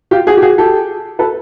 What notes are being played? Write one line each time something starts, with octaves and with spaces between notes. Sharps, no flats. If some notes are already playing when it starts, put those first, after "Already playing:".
F4 G4
F#4 G#4
G4
F#4 G#4
G4 A4
A4 B4